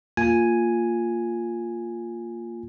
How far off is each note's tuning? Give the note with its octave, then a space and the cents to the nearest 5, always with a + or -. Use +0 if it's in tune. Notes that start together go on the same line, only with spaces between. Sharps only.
A#3 -15 F4 +0 G#5 +0